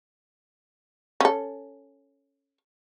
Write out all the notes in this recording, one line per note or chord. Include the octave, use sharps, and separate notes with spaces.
C#4 A4